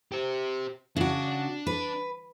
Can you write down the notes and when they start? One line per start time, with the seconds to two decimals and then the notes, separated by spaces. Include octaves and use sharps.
0.12 G4 C5
0.96 C#3 D4 F#4 D5
1.67 B4